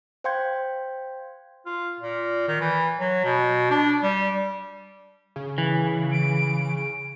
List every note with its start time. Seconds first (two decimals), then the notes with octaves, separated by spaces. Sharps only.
0.24 C5 F5 G5 C6 G6 G#6
1.66 F4
2.00 A#2
2.48 D#3
2.61 E3
2.99 F#3
3.25 B2
3.71 D4
4.03 G3
5.36 C#3
5.58 E3
6.12 D7